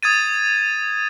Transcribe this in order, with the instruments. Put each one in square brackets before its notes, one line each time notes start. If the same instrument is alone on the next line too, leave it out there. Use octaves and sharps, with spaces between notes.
[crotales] D#6 G#6 A6 D#7